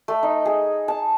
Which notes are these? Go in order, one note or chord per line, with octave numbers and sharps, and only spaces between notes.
A3
D#4
G#4
A5